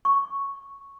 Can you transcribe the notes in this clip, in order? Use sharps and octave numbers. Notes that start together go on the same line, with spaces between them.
C#6